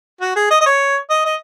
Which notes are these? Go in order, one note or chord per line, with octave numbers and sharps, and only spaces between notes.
F#4
G#4
D#5
D#5
C#5
D#5
D#5